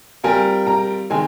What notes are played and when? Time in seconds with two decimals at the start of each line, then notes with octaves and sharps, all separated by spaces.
0.23 G3 C4 F4 A#4 G#5
0.67 A#5
1.10 D#3 G#3 C4 G#5